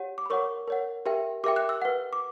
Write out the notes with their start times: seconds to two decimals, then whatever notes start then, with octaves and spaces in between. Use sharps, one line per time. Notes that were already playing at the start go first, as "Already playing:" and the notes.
Already playing: G4 C#5 F#5
0.18 D6
0.26 B5
0.30 A#4 C#5 F#5 C#6
0.68 A#4 C#5 F#5
1.06 G4 A#4 E5 G5
1.44 G4 A#4 E5 G5 D6
1.56 F#6
1.69 E6
1.82 B4 F#5
2.13 D6